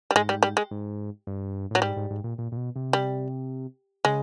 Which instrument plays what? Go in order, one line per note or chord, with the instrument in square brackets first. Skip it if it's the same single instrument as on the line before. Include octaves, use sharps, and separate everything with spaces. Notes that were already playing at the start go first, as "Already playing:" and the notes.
[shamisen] G3
[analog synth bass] G#2 [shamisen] G#3
[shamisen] G3
G3
G#3
[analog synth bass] G#2
G2
[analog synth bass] A2 [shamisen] F#3
[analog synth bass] G#2 [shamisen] G3
[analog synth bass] G#2
G#2
A#2
A#2
A#2
B2
C3
[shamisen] G3
[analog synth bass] C#3 [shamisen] G#3